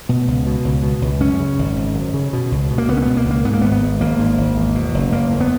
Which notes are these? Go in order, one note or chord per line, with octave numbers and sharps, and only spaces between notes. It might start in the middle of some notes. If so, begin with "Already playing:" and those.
B2 B3
C#2
B2
C#2
B2
C#2
F#2 C#4
C#3
G#1
G#1
F#2
C#3
B2
C#2
B2
A#3
C#2 B3
C#4
B3
B2
A#3
C#2
A#3
G#2 B3
A#3
G#1 B3
B3
G#2
G#1 A#3
G#2
G#1
E2
B2
F#1
F#1 A#3
E2
B3